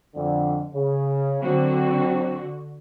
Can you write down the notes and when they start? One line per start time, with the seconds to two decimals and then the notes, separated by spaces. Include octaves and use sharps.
0.15 F2 D3
0.74 C#3
1.43 D3 F#3 C4 F#4